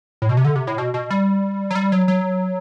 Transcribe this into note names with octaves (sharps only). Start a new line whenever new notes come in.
A2
B2
C3
D3
C3
A2
B2
B2
G3
F#3
G3
F#3
F#3